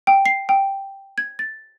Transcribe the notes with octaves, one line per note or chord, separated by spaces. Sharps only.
G5
C7
G5
G#6
A6